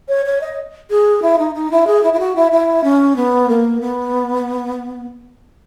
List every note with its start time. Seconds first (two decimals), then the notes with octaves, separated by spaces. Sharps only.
0.08 C#5
0.26 C#5
0.41 D#5
0.90 G#4
1.22 E4
1.38 D#4
1.54 D#4
1.71 E4
1.87 G#4
2.03 E4
2.13 E4
2.19 F#4
2.35 E4
2.52 E4
2.83 C#4
3.16 B3
3.49 A#3
3.81 B3